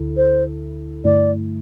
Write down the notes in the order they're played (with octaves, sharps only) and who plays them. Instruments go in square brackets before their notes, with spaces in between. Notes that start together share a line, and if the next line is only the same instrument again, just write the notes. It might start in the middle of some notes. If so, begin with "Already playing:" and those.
Already playing: [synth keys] D2 D3 E4 A4
[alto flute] C5
[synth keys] G2 D3 A3 E4 [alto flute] D5